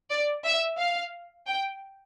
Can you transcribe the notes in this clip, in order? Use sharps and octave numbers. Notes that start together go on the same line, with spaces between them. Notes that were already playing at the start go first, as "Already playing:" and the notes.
D5
E5
F5
G5